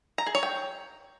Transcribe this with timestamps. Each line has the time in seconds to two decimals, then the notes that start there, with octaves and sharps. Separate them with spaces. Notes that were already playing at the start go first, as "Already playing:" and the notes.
0.18 A#5
0.26 G#4
0.35 C#5
0.43 G5